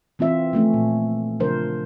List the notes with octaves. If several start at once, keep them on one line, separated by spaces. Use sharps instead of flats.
E3 C4 F4 E5
F3 A3 C#4
A#2
C#3 F3 D4 A#4 C5